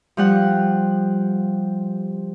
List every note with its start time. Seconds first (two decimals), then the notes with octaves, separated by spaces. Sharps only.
0.17 F3 G3 F#5